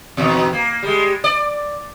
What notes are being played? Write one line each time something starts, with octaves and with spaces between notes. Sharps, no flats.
E2 B2 D#3
A#3
G3 G#3
D5